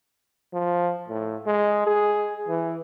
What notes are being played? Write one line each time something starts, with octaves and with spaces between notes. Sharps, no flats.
F3
A2
G#3
G#4
E3